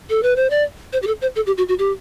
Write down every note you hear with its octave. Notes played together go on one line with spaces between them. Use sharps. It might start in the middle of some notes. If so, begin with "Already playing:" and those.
A4
B4
C5
D5
C5
G4
A4
C5
A4
G4
F#4
F#4
G4